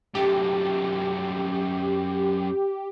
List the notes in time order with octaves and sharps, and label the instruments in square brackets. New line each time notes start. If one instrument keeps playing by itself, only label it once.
[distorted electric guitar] F#2 A3 [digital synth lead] G4